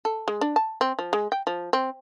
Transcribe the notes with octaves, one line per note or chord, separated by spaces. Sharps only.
A4
G#3
D4
A5
C4
F3
G#3
G5
F3
C4